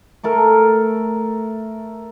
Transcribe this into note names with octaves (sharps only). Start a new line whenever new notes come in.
A3 A4 A#4